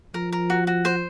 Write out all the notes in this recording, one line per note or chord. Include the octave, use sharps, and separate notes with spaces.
F3 A#4
A#4
F#4
F#4
C5